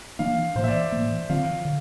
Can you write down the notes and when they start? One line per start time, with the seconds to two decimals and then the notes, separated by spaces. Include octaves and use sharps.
0.19 E3 A#3 D4 F5
0.55 A2 E3 A#3 C5
0.64 E5
0.68 D5
0.92 A2 E3 A#3
1.29 D3 F3 C4 F5
1.65 D3